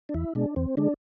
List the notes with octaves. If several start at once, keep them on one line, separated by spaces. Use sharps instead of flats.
D4
E2 E4
B2 G#3 D4
E2 C4
D3 G#3 D4